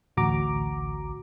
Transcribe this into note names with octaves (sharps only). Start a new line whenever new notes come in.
A1 D2 F#4 A#5 D6